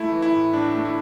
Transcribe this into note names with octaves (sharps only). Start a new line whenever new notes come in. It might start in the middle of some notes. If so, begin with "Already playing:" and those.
Already playing: A3 E4
E3
E4
A2
A2 D4
A3
E4